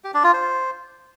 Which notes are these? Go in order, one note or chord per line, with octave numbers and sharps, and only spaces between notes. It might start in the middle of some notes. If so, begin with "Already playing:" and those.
G4
D4
F4
C5